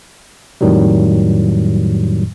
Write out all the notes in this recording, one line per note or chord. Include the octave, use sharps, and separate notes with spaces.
F2 A2 D#3 F#3 G3